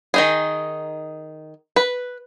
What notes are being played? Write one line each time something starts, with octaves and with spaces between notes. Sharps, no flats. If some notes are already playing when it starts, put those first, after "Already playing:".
D#3 D#4 G#4
B4